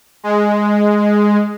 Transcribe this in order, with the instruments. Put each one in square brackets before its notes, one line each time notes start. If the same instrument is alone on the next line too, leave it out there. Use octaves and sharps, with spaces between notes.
[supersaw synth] G#3